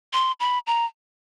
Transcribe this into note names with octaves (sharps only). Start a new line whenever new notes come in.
C6
B5
A#5